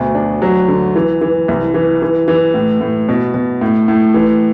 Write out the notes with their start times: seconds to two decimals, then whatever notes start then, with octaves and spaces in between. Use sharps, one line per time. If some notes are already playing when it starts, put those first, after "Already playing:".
Already playing: D2 B2
0.15 D4
0.42 F#3
0.68 D3
0.95 E3
1.21 E3
1.48 C2
1.74 E3
2.02 E3
2.28 E3
2.54 A2
2.81 A2
3.09 B2
3.34 B2
3.61 A2
3.88 A2
4.14 E3